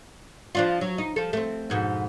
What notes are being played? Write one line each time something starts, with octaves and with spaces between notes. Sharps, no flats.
F3 D4 F4
F#3
D#4
F3 A4
A3 C4
F2 G#2 B2